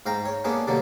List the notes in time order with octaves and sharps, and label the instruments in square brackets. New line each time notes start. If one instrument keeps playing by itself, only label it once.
[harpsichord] G#2 F5 G5 A#5
C#5
A#3 B3 C#4 D4 G#4
B2 D3 F#3 G3 A#3